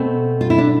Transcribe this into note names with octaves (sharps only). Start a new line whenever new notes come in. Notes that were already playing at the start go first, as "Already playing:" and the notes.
Already playing: B2 A3 C4
F4
E4
D4